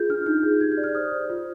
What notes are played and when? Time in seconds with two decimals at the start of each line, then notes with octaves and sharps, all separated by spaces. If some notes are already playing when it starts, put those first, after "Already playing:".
Already playing: F4 G#4 G6
0.10 D4 F6
0.26 D#4 G6
0.43 G#4
0.61 G4 G#6
0.72 G6
0.77 D5
0.84 F6
0.95 C5 D#6
1.12 C5
1.30 F4